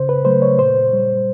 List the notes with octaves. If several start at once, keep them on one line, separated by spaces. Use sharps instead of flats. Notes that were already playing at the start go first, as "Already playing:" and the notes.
Already playing: C#3 C5
B4
F#3 A3 C5
C#5
A#2 C5
G3